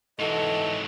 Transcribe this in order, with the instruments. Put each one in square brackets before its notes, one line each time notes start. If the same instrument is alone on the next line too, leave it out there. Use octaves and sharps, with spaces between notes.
[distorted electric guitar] G#2 F#3 [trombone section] E3 A4 [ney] D#5